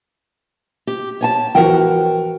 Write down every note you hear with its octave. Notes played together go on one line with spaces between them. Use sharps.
G4
C#5 G#5 A5
E3 F3 F#4 A#4 F#5 G5